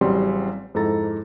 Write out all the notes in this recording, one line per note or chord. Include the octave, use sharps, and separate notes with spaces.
A1 C#3 F#3 G3 C4 C6
F2 G#2 E4 A4 A#5 A6